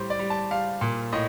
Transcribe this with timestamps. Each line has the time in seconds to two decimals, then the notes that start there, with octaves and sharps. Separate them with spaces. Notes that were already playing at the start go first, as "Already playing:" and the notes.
Already playing: A2 G3 C5
0.10 D5
0.19 G3
0.30 A5
0.51 G3 F5
0.81 A#2
1.13 A2 D#5